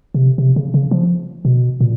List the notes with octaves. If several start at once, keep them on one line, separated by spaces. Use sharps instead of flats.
C3
C3
C#3
C#3
F3
B2
A#2